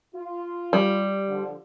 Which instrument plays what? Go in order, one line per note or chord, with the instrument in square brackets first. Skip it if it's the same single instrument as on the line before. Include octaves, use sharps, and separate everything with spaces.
[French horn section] F4
[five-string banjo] G3
[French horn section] D3 F3